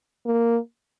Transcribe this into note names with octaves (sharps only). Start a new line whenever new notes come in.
A#3